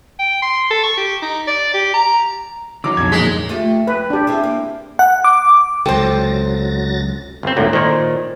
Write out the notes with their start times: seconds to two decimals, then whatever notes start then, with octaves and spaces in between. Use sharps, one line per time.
0.19 G5
0.42 C6
0.70 A4
0.84 C#6
0.97 G4
1.22 D#4
1.47 D5
1.74 G4
1.94 A#5
2.84 D3 F#3 D#4 D6
2.97 B1 F2 C#5 G#6
3.12 A#2 G#3 B6
3.49 A3 F4 G4
3.87 F2 B4
4.10 D4 G4
4.27 C4 E4 G#4
4.44 A#3
4.99 F#5
5.24 D6
5.86 C#2 C3 F#3 A4 C5 G5 A6 A#6
7.43 G1 C4
7.56 G#1 D2 A#2 E4 A4 C#5
7.73 A#2 D#3 C5 D5 C6